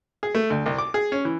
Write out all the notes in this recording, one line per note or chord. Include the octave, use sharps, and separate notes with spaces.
G#4
A3
D2
C2
D6
G#4
C#4
E3